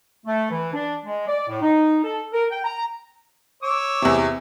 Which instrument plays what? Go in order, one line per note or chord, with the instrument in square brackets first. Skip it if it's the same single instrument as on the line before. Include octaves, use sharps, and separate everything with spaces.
[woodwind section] A3
E3
D4
G#3
D5
A2
D#4
A4
A#4
G5
A#5
[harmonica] C#5 D6 E6
[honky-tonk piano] E2 C3